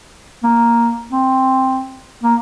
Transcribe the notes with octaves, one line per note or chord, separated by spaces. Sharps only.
A#3
C4
A#3